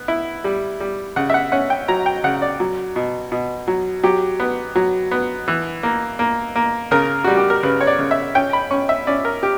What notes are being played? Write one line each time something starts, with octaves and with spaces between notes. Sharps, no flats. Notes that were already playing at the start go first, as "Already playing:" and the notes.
Already playing: B3
E4
G3
G3
C#3 F#5
E5
F#5
C#4 F#5
G5
F#3 A#5
G5
C#3 F#5
D5
F#3
B2
B2
F#3
F#3 G4
B3
F#3
B3
E3
A#3
A#3
A#3
C#3 A#4
G3 F#4
G4
A#4
C#3 B4
C#5
D5
C#3
E5
C#4 G5
B5
C#4 C#6
E5
C#4 D5
A#4
G4